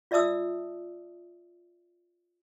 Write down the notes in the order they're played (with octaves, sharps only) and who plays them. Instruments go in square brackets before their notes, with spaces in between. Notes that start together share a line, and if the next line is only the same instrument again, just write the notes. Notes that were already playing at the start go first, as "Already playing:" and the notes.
[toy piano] F4 D5 E5 A5 D#6 E6